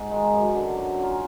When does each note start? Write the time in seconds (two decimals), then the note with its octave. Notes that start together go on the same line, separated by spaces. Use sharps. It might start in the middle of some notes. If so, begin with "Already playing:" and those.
Already playing: G#2
0.11 D#3 G#3
0.33 F#2
0.55 D3 F#3
0.77 F#3
0.99 A#3 C#4 F4